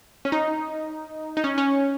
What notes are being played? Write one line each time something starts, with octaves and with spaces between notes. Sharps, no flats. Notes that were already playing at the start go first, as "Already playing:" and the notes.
C#4
D#4
D#4
C#4
C#4